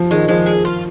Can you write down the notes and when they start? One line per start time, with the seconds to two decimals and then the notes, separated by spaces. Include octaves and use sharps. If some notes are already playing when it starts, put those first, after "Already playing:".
Already playing: F3
0.11 D#3 G#3
0.28 F3 G#3
0.46 G#4
0.65 F4